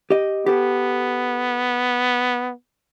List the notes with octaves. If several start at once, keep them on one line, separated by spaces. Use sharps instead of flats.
G4 D#5
B3 G4 A4